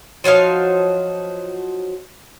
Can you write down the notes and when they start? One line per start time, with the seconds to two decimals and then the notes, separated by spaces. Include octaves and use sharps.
0.24 F3 F#3 D#4 F5